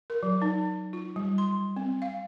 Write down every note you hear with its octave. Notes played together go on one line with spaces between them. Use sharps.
A#4
F#3
D#4
F4
G3
C6
C4
F5